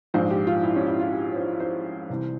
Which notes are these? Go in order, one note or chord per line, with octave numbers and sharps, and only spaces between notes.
A#1 G#2 F3 C5
G4
F4
E4
C#4
E4
F4
G4
C#5
C5
C5
C2 C3 E3